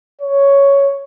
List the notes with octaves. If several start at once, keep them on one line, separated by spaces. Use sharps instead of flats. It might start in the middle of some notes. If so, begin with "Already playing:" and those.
C#5